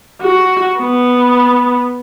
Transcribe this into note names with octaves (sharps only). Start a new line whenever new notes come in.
F#4
B3